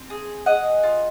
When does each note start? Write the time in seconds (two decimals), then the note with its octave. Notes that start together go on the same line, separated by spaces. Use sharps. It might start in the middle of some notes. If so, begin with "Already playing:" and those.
Already playing: C4
0.10 G#4
0.46 G#4 D#5 F#5
0.83 F4